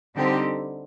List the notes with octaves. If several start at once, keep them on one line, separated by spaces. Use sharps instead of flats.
D3 G3 C4 D#4 G4